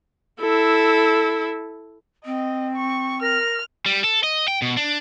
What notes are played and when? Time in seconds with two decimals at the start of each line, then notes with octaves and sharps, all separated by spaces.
0.40 E4 A4
2.25 C4 D#5
2.76 C#6
3.22 A#4 F6
3.86 G3
4.04 A4
4.24 D#5
4.48 G5
4.62 B2
4.77 D4